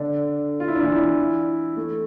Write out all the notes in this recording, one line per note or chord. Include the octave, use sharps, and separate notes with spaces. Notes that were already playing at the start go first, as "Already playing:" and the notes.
Already playing: D3 D4
F4
E4
D4
E3 E4
A3